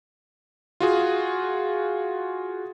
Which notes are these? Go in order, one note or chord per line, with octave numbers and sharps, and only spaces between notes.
F4 F#4 G#4